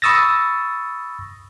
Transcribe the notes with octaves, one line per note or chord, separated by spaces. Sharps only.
B5 C#6 D#6 E6 A6 A#6